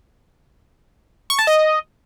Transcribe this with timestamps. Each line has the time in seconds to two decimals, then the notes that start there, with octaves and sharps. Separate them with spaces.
1.30 C#6
1.39 A5
1.47 D#5